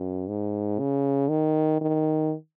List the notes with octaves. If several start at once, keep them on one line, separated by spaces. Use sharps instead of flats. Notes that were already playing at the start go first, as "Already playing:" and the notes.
Already playing: F#2
G#2
C#3
D#3
D#3